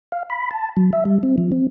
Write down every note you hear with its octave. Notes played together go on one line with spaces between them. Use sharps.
F5
B5
A5
F#3
E5
G3
C4
F3
C4